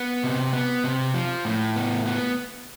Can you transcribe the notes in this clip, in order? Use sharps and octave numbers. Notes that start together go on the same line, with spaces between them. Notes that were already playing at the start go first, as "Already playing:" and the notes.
Already playing: B3
C3
B3
C3
F3
A2
B3
B3